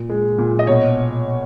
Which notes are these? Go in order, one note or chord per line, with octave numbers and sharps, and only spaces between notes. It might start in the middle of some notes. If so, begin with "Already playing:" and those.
Already playing: A#2
G#3
A#2
D#5
B2 C#5